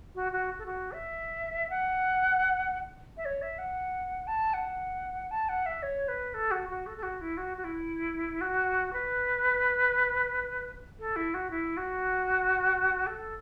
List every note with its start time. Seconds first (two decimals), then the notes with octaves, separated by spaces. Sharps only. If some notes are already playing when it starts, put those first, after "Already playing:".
0.15 F#4
0.32 F#4
0.59 A4
0.66 F#4
0.92 E5
1.70 F#5
3.17 E5
3.25 C#5
3.42 E5
3.58 F#5
4.27 A5
4.53 F#5
5.31 A5
5.49 F#5
5.66 E5
5.82 C#5
6.08 B4
6.34 A4
6.51 F#4
6.69 F#4
6.86 A4
6.97 A4
7.03 F#4
7.21 E4
7.37 F#4
7.57 F#4
7.64 E4
8.41 F#4
8.93 B4
10.99 A4
11.16 E4
11.34 F#4
11.50 E4
11.77 F#4
13.06 A4